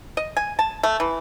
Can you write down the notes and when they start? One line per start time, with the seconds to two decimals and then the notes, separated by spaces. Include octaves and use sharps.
0.17 D#5
0.37 G#5
0.59 A5
0.83 A3
1.00 E3